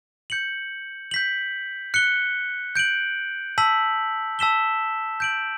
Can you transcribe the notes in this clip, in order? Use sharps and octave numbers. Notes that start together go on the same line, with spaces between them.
G6 C#7 F#7
G6 B6 F#7
F#6 C#7 G7
G6 D7 F#7
A5 E6 B6 F#7
A5 E6 B6 E7 G7
G6 D7 F#7